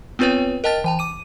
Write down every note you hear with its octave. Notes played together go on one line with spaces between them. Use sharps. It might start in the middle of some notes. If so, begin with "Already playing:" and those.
B3 C4 F4 B4 C#5 G5
A#4 D#5 G5 A5 F6 A6
E3 G5 A5
D6 D#7